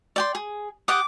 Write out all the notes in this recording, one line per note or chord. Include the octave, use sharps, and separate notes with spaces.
D5 G5 C6
G#4
G4 F#5 D6 D#6